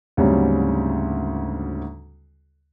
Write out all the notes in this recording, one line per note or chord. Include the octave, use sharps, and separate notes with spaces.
D2 G#2 C#3 F#3 G3 C4